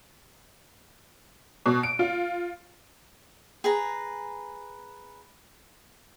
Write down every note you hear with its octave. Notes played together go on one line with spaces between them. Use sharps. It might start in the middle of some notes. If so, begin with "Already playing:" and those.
B2
D7
F4
G#4 B4 A#5